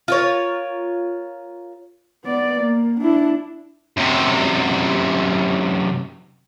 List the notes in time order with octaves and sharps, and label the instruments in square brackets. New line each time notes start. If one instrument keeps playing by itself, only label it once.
[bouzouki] F4 A#4 C#5
[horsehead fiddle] B3 D5
A#3
D4 E4
[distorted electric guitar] F#2 C3